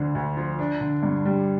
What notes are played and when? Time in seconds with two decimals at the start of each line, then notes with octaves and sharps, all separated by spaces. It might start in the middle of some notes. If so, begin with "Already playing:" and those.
Already playing: D2 D3
0.15 D2
0.37 F3
0.59 D4
0.81 D3
1.03 G2
1.25 G3